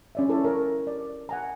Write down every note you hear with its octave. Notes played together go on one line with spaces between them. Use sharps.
C#4 D5 E5
E4 A4 B4 C#5
A#4 C#5
D5
F#5 G#5 A#5